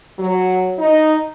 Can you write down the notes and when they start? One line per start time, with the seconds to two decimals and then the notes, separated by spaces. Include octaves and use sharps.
0.19 F#3
0.79 D#4